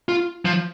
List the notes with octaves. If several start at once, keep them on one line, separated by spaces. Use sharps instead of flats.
F4
F3